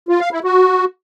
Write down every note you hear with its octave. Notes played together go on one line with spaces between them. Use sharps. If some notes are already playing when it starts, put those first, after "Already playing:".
F4
F5
E4
F#4